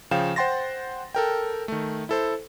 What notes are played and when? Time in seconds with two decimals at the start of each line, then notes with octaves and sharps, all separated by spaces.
0.11 C#3 F3 F5 G5 E7
0.36 C5 F#5 G5 C6 A6 A#6
1.15 A4 A#4 G5
1.68 D#3 A3
2.09 E4 A4 C5